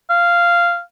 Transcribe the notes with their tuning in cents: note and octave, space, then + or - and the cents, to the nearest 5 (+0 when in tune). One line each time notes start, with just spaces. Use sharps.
F5 -10